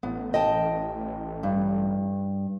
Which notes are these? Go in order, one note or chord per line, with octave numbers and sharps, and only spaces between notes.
A1 B3
D#5 G5 A5
G2